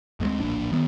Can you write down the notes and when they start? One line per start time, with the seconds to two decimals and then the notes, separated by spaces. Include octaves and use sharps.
0.20 D2 G#3 A#3 C4
0.40 D1 A#1 A#2 D4
0.72 D#3 B3